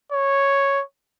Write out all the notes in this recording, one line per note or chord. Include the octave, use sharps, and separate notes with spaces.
C#5